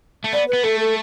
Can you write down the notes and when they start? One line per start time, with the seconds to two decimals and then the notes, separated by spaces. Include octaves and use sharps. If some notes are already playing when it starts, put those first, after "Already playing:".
0.24 A3
0.33 B3 D5
0.48 B4
0.53 B3
0.64 A3 A4
0.80 A4